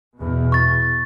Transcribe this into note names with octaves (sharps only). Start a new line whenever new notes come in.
E2 B2
C#6 A6